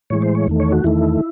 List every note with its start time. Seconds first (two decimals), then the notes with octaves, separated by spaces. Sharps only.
0.10 A2 E3 G#3 C#5
0.22 C5
0.35 C#5
0.47 E2 D#3 A3
0.60 C#5
0.72 F#4
0.84 E2 D#3 A3 E4